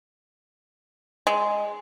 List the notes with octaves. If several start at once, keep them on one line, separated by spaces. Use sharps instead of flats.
G#3